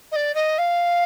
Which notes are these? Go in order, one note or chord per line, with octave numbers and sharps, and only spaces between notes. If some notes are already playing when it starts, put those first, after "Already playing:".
D#5
D5
D#5
F5